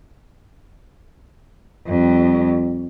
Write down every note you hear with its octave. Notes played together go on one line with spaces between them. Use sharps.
F2 G3